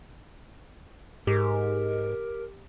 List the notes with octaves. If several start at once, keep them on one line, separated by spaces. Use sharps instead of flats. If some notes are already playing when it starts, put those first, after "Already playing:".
G#2 G4 A#4